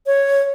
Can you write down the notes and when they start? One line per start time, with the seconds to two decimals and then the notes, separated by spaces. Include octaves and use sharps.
0.06 C#5